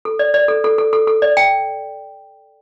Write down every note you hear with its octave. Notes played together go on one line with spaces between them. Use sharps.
A4
D5
D5
A4
A4
A4
A4
A4
D5
G5